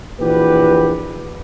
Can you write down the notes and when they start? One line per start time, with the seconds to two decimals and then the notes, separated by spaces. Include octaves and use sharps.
0.20 A#1 A#2 E3 F#4 G4 B4